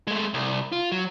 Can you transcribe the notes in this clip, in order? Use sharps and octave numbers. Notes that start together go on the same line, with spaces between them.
G#3 A3
C2
F4
F#3